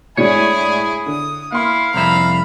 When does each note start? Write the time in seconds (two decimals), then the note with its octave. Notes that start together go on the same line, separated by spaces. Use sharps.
0.17 A2 G#3 D4 E4 G#4 C#5 G#5
1.06 D3 D#6
1.52 A#3 E4 F5 C6
1.94 C2 F2 E5 A#5 B5